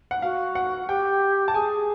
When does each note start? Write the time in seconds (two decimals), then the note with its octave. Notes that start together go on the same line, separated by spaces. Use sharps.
0.11 F#5
0.22 F#4 F5
0.55 F#5
0.88 G4 G5
1.48 A5
1.54 G#4 G#5